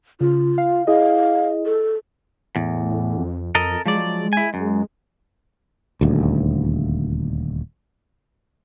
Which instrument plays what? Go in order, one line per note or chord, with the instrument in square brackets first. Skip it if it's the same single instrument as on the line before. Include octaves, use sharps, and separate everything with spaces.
[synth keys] C#3 [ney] F4
[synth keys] F5
[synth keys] E4 G#4 D#5 [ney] F5
[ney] A4
[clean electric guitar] E2 [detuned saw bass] A2
[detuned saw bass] F2
[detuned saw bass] F2 [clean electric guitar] A4 A#4 D#5
[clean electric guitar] F3 F#3 D5 [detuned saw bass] G#3
[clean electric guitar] E4 G#5
F#2
[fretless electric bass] D#1 D2